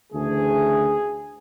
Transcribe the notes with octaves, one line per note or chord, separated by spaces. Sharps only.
D2 C#3 E3 A3 G#4